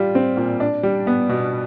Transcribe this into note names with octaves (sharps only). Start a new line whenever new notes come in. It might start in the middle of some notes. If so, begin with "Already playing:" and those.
Already playing: G3 F4
C4
A#2
D4
G3
B3
B2